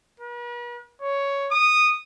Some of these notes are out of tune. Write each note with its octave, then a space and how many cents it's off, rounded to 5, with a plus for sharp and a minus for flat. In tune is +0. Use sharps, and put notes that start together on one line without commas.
B4 -45
C#5 +10
D#6 -10